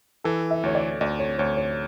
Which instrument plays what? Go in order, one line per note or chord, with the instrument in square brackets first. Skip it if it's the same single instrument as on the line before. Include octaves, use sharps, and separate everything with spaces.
[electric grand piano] E3 [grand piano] A4
[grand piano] E5
[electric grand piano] D2 [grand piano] C#5
[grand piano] D5
[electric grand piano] D2 [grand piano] D5
[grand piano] C#5
[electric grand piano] D2 [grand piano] C#5
[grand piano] C#5